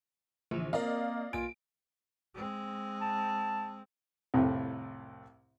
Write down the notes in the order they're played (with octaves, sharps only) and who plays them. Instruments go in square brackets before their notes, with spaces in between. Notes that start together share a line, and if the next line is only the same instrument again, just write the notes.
[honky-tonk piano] A#1 [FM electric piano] D3 E3
[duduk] A#3 [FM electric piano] C4 A#4 [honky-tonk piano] D5 D#5 F5
[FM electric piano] B1 A#3 G#5 [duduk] F4 [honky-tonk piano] D7
[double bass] G#3 C4
[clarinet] A5
[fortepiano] C2 F2 A2